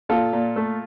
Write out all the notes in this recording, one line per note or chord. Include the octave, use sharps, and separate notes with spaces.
A#2 F4 A4
A#2
A3